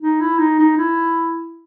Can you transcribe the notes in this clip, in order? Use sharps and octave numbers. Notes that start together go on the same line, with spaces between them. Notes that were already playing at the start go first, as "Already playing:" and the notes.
D#4
E4
D#4
D#4
E4